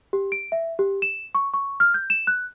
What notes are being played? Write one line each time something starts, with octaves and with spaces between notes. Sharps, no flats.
G4
D7
E5
G4
E7
C#6
C#6
F6
G6
E7
F#6